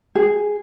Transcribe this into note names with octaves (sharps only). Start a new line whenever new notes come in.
G#4